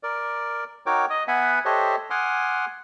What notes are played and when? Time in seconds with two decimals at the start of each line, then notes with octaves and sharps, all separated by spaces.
0.03 A#4 D5
0.86 D#4 F#4 A#4 C#5 G5 D6
1.10 D#5 D#6
1.28 B3 B4 E5 F#5 G#5
1.65 G4 A4 C5 C#5 D#5 E5
2.10 F#5 G#5 C6 D6 D#6 F6